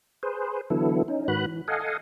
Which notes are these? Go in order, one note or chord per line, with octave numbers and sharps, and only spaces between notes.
G#4 B4 C5
D3 E3 F#3 B3 E4 A4
C#4 D#4
G#2 D#3 F#4 B4 B5 F#6
E3
A4 D#5 F5 F#5 G#5